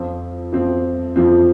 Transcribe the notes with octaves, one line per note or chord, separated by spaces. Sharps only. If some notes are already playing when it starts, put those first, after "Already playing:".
Already playing: F2 F3 C4
F2 F3 C4
F2 F3 C4